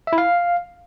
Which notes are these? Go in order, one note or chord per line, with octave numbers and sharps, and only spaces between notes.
E5
E4
F5